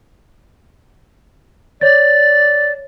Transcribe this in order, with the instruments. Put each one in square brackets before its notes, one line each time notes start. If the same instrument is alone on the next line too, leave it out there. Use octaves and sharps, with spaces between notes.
[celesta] C#5 A6 [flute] D5